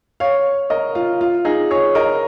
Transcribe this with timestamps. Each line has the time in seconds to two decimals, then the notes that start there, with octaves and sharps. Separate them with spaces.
0.20 C#5 F5
0.70 A#4 D#5
0.95 F4
1.21 F4
1.45 D#4 G#4
1.71 G#4 C#5
1.95 A#4 D#5